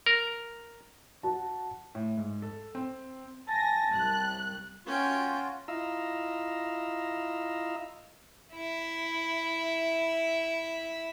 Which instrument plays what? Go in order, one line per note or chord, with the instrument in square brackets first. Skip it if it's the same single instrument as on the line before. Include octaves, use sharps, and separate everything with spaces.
[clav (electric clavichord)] A#4
[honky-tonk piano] F#4 A5
[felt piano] A2
G#2
A4
C4
[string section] G#5 A#6 [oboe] A5
[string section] C2 F#6
[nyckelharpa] C#4 G5 [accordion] F4 F#4
[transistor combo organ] E4 F4 D#5 F5 A#5 E6
[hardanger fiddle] E4 E5